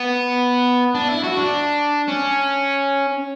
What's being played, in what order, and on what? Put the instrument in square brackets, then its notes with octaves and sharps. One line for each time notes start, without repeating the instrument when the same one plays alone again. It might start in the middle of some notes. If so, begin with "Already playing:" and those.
Already playing: [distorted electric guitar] B3
D4
E4
F#4
D4
C#4